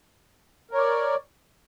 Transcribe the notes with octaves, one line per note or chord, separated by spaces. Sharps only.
A#4 C#5 D5